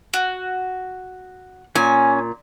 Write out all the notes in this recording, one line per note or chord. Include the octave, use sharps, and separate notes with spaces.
F#4
A#2 C#4 G#5